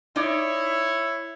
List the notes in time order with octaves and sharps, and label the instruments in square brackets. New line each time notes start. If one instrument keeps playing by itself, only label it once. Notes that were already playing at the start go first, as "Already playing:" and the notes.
[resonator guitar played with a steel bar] D#4 D5 [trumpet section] E4 C#5